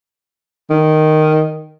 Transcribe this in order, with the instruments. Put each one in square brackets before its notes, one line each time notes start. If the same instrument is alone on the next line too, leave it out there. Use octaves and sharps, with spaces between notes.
[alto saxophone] D#3